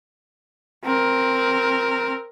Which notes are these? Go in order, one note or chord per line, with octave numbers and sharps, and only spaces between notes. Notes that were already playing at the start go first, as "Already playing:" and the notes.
C4 A#4